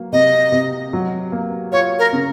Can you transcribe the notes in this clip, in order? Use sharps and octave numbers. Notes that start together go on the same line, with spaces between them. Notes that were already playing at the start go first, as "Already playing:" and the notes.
Already playing: F#3 A#3
C3 D#5
C3
F#3
A#3
F4 C#5
A#4
C#3